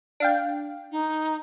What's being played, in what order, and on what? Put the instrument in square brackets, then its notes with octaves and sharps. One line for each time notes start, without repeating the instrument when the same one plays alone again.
[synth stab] D4 F5 G5
[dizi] D#4